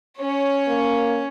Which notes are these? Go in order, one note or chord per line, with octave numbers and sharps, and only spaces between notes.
C#4 C#5
A#3